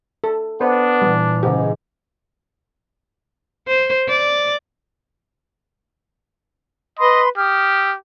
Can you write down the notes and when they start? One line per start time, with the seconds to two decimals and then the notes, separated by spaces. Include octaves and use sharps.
0.24 A4
0.61 B3 D4 C5
1.02 A#2 E3 G3
1.43 G#2 C#3 G4
3.67 C5
4.09 D5
6.99 B4 D#5 B5 C6
7.37 G4 D#6 F6